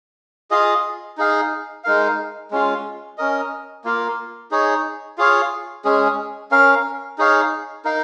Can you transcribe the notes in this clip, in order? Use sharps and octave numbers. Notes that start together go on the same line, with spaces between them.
F4 G#4 D#5
D#4 G#4 F5
G#3 D#4 A#4 F5
G#3 C#4 F4
C#4 A#4 D#5
A#3 F4 A#4
D#4 G#4 C#5
F4 G#4 C#5 F5
G#3 C#4 G#4
C#4 A#4 F5
D#4 G#4 C#5 F5
D#4 A#4 F5